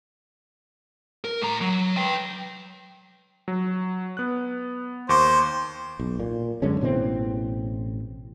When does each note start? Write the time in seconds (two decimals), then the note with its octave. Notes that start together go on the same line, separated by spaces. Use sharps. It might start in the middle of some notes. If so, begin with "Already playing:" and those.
1.24 A#4
1.42 A2 A#5
1.61 F#3
1.97 B4 G5
3.48 F#3
4.17 B3 F#6
5.09 D#2 C5 C#6 D6
6.00 B1
6.20 A#2
6.62 F#2 D3 G#3 C#4
6.81 A1 B2 E3 C4